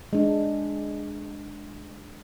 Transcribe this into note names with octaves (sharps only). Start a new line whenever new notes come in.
G#3 D4